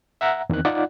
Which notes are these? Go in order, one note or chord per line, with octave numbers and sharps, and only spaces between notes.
E5 F#5 A#5
E2 D#3 C4 F#6
D#4 F4 D5 F#5